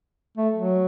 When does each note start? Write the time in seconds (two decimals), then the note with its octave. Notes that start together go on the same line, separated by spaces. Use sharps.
0.38 A3
0.55 F#3